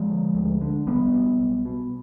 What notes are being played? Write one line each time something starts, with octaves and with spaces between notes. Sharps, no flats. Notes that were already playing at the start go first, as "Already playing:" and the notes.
Already playing: F3 G#3
D3
D2
D3
B1 G3 B3
B2
B1
B2